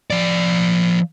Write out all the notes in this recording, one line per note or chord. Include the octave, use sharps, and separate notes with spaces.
F3 D5